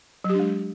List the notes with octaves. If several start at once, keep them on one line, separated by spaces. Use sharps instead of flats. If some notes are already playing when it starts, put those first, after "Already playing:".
F#3
G4
D4
G#3